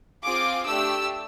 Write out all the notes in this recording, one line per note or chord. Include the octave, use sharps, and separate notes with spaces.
C4 F4 G#4 D6
A3 D4 G4 E6